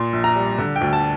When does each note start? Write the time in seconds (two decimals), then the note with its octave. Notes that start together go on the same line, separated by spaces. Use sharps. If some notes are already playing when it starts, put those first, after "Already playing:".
Already playing: A#2 C6
0.13 A#1
0.24 A#5
0.36 G3
0.59 D3
0.76 G5
0.81 D2
0.93 A5